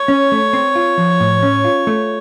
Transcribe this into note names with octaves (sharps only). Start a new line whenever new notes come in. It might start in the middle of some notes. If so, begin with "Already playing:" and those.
Already playing: C#5
C#4
A3
C4
F4
F3
A2
C#4
F4
A3